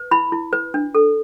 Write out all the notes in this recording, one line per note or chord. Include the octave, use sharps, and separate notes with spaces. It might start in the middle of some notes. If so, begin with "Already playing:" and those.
Already playing: B4
E4 B5
E4
B4
D4
A4